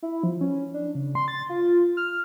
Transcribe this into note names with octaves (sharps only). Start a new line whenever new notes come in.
E4
F3
C#4
D4
C#3
C6
A6
F4
F6